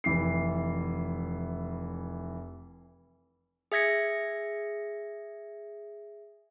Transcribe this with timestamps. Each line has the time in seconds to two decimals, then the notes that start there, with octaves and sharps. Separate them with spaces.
0.04 F1 E3 C7
3.72 G#4 E5 G#6 A#6 C#7